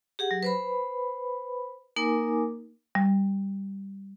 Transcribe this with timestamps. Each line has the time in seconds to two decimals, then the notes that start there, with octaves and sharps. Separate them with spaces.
0.19 G4 G#4 F#5
0.31 F#3
0.43 B4 C5 B5
1.96 A#3 D#4 A#4 G#5 D6
2.95 G3